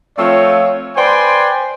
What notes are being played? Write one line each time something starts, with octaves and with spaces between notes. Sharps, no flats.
F3 A3 C4 F4 C#5
B4 C5 D5 G5 G#5 C6